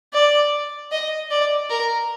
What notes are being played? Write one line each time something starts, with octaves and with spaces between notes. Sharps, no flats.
D5
D#5
D5
A#4